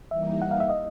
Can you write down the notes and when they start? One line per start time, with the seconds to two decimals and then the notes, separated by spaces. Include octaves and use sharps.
0.11 E3 G3 A#3 D#4 E5
0.42 F#5
0.51 F5
0.60 E5
0.69 D#5